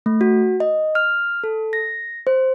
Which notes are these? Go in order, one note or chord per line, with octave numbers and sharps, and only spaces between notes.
A3
F#4
D#5
F6
A4
A#6
C5